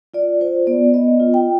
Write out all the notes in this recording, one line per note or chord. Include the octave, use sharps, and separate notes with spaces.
F4 D5
F4 C5
B3 D5
B3 D#5
F4
G5